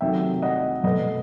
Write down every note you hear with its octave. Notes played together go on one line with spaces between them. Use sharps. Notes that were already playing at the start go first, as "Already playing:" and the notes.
C3 D#3 F#3 A3 E5 G5
D#5 F#5
B2 A3 B4 D#5